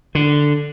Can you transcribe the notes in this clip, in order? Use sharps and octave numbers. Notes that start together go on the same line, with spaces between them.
D3